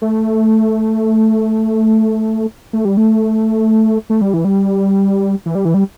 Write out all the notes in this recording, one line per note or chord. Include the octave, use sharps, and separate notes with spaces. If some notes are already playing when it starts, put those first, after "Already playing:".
A3
A3
G3
A3
A3
G3
E3
G3
E3
G3
E3
G3